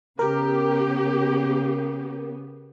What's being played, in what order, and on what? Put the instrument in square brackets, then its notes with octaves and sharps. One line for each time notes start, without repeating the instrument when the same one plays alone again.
[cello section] C#3 B3 [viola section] G4 [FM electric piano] A#4